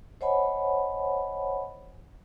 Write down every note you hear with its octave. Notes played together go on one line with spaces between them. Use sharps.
C5 C#5 D#5 F#5 G#5 B5